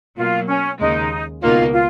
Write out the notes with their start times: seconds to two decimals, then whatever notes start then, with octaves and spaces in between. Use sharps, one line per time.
0.17 B2 F#3 A#3 F4
0.48 C#4
0.79 D#2 C#3 G#3 D#4
1.42 C#2 B2 A#3 D#4 F4
1.72 F4